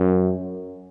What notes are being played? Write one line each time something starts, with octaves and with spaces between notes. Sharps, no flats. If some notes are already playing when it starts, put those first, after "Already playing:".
Already playing: F#2